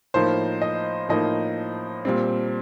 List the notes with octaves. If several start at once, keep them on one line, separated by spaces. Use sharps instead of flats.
A2 F3 A#3 D#4 C5
D#5
A2 F3 A#3 D#4 D#5
A#2 G3 C4